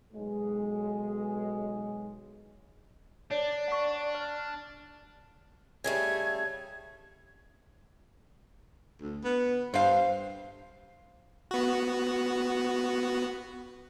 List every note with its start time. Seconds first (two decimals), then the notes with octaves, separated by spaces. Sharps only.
0.13 B1 G#3
3.31 D4 C#5 D5
3.68 F#5 C#6
4.15 F6
5.84 C#3 G3 A3 G#6
9.00 D2
9.24 B3
9.74 G2 C5 F5
11.51 B3 F#4